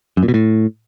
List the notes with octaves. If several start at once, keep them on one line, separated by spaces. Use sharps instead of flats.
F#2
A#2
B2
A2